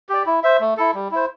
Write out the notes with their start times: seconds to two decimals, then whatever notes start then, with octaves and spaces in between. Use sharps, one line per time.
0.09 G4 D5
0.26 E4
0.43 C5 E5
0.60 A3
0.77 E4 A4
0.94 G3
1.11 E4 C5